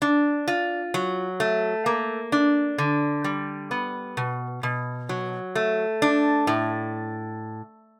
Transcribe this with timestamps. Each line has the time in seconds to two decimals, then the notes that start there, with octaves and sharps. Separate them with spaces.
0.02 D4
0.48 F4
0.94 F#3
1.40 A3
1.86 A#3
2.32 D4
2.78 D3
3.24 G3
3.71 B3
4.17 B2
4.63 B2
5.09 F#3
5.55 A3
6.02 D4
6.47 A2